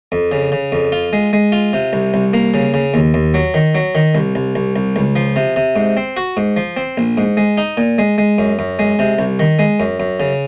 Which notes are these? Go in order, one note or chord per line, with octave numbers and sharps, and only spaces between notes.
F2
C#3
C#3
F2
F4
G#3
G#3
F4
C3
C2
C2
A#3
C#3
C#3
D#2
D#2
F#3
D#3
F#3
D#3
C2
C2
C2
C2
C#2
F3
C3
C3
G#2
C4
F#4
G#2
F3
C4
A#1
G#2
G#3
D#4
A#2
G#3
G#3
F#2
F#2
G#3
C3
C2
D#3
G#3
F#2
F#2
C#3